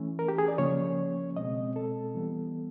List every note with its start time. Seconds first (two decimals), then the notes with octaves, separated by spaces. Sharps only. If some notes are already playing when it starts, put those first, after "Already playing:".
Already playing: E3 A3 C#4
0.19 A#4
0.28 G4
0.38 G#4
0.48 D5
0.58 C#3 F3 A#3 C#4 C#5
1.37 B2 G#3 C4 D#5
1.76 A4
2.15 E3 G3 B3